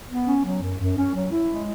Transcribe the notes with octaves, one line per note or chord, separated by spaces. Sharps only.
B3
C#4
F#3
F#2
F#2
C#4
F#3
E4
G#3